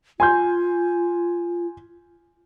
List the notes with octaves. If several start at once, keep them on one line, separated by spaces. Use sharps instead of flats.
F4 G#5 C6 G6